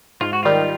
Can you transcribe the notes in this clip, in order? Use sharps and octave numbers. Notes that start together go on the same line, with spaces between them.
G#2 F4
F#4
D#3 G3 F4